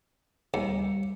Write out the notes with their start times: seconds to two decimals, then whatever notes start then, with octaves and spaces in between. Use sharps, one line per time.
0.54 D#2 G3 C#7